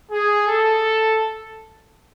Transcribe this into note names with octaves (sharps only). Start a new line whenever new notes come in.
G#4
A4